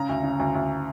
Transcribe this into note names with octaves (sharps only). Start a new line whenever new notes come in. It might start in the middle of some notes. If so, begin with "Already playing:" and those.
Already playing: C#3 A#5
D2
C#3
D2
D2